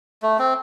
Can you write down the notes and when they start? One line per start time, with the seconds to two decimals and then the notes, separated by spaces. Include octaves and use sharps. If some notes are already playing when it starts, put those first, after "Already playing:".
0.22 A3
0.39 C4